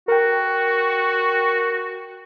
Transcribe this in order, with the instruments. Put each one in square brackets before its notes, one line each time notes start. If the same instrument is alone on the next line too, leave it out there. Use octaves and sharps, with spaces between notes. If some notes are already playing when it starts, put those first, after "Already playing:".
[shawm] F#4 [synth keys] A#4 G5